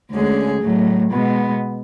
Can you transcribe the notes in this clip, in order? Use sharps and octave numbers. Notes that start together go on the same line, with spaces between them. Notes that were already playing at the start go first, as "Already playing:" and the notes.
D2 D3 G#3 C#4 G#4
A2 F#3 A3
B2 G#3 B3